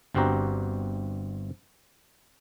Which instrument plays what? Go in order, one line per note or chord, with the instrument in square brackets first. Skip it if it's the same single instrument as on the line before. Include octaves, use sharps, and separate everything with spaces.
[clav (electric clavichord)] G1 G2 C4 F#4 G4 A#5